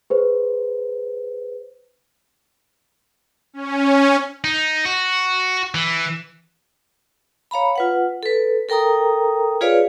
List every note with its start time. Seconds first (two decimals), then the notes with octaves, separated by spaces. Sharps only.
0.10 G#4 B4 C5
3.53 C#4
4.44 D#4
4.85 F#4
5.75 E3
7.51 C#5 F5 A#5 B5
7.76 F4 B4 F#5
8.23 A4 B4
8.69 A4 A#4 G5 A#5 D#6
9.61 F4 G#4 B4 C#5 D5 F5